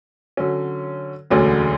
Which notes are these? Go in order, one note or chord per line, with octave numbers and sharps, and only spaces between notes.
D3 F#3 C#4
E1 D2 D3 F#3 C#4